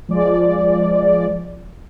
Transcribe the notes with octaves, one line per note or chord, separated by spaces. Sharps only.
F3 G#3 D5